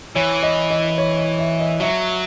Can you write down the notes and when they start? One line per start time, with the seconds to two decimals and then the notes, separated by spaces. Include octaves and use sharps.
0.16 E3 C#5
0.43 D#5
0.70 D#5
0.98 C#5
1.18 D#5
1.39 E5
1.60 D#5
1.80 F#3 E5